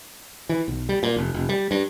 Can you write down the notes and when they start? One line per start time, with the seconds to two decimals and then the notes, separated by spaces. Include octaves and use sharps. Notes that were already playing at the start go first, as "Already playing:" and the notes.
0.49 E3
0.68 B1
0.89 G3
1.03 A#2
1.16 F1
1.34 F1
1.49 G3
1.71 G2